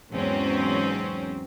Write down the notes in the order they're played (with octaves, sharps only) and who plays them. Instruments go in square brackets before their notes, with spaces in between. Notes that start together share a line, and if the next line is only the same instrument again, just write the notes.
[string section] E2 G#2 F#3 C4 C#4